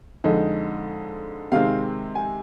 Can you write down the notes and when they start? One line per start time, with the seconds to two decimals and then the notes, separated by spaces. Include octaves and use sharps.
0.24 F2 D3 G#3 D#4
1.52 C3 D#3 G#3 C4 F5
2.15 G#5